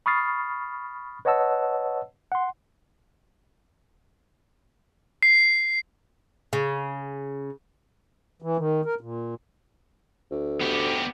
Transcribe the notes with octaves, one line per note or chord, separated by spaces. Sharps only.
B5 C#6 D#6 F6 A6 C7
B4 C#5 D#5 F#5 A5 E6
F#5 C6
C7
C#3
E3
D#3
A#4
A#2
D2
B3 G4